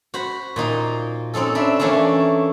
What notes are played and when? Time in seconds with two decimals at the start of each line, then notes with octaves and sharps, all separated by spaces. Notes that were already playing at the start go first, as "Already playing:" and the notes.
0.14 F#4 C5 B5
0.56 A#2 A#3 D#4 C6
1.34 C4 C#4 D#4 A4
1.55 D4 E4 E5
1.79 E3 A3 A#3 C#4 D4